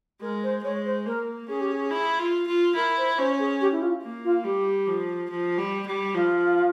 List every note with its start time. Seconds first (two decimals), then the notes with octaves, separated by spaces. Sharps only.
0.21 G#3 A#4
0.43 C5
0.64 G#3 C#5
0.85 C5
1.06 A#3 A#4
1.48 C#4 G#4
1.60 G4
1.72 G#4
1.91 E4
2.19 F4
2.48 F4
2.75 E4 A#4
2.97 C5
3.18 C#4 C5
3.39 G#4
3.61 G4
3.72 E4
3.82 F4
4.03 A#3
4.24 F4
4.45 G3 G4
4.87 F3
5.30 F3
5.58 G3
5.86 G3
6.14 F3 F4